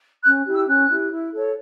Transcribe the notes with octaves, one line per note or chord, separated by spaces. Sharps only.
C#4 F#6
E4 G4
E6
C#4 F#6
E4 G4
E4
A4 C#5